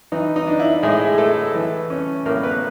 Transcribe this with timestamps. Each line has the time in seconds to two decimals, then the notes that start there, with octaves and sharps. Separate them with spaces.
0.12 E3 D#4
0.36 D#4
0.47 D4
0.60 E4
0.83 A2 G#3 G#4
1.18 A3 A4
1.55 E3
1.90 C#4
2.26 A2 A#3 A#4
2.43 B3 B4